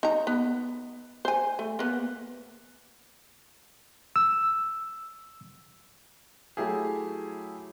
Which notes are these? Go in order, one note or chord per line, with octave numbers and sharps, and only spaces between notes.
D#4 A#5
B3
C5 G#5
A3
A#3 B3
E6
F#3 A3 E4 G4 G#4